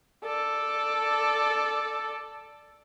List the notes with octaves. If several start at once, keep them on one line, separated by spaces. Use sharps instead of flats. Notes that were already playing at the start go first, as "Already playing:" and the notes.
A4 D5